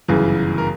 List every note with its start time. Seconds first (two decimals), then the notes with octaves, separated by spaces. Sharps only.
0.08 G1 F#2 C#3 E3 G#4
0.58 A#4